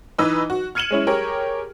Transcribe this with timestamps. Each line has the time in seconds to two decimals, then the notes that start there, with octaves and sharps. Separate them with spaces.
0.19 E3 D#4 B4 D#5 E6
0.50 F#4
0.75 F6 G#6 C#7 D#7 E7 F#7
0.90 G#3 C#4 E4
1.07 G4 G#4 A#4 C#5